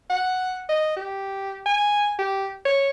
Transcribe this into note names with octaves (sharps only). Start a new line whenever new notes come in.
F#5
D#5
G4
G#5
G4
C#5